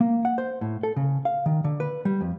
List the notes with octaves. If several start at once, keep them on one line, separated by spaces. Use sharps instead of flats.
A#3
F#5
C5
A2
A4
C#3
F5
D#3
D3
B4
G3
F2